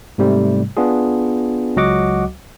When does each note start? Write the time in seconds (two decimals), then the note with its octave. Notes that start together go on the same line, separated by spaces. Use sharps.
0.18 G#2 C3 G3 A3
0.77 B3 D4 F4 G#4
1.76 C#2 F#3 F#4 D#5 F#5 D6